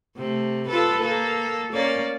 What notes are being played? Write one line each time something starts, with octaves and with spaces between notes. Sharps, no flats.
C3 A3
F4 A4 B4
A#3 A4
A#3 C#4 D5